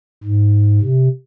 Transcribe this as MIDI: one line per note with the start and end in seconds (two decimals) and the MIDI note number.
0.23 0.80 44
0.81 1.08 48